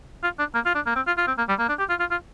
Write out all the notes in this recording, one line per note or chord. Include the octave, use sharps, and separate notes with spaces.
F4
D4
A#3
F4
D4
A#3
C4
F4
F4
C4
A#3
G3
A#3
D4
G4
F4
F4
F4